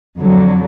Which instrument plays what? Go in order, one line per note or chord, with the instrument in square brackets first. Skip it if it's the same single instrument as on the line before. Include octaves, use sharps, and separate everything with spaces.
[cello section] F2 D3 F#3